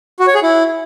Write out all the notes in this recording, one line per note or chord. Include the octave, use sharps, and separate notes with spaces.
F#4
C#5
G#4
E4